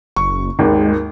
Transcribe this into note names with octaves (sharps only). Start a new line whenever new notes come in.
F#1 C#6
G#1 D#2 G#3